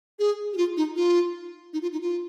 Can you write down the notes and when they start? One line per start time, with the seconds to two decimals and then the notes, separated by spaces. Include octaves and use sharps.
0.19 G#4
0.53 G4
0.57 F4
0.77 D#4
0.96 F4
1.73 D#4
1.82 F4
1.92 D#4
2.02 F4